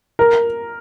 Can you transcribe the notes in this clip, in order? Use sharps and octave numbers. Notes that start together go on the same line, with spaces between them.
A#4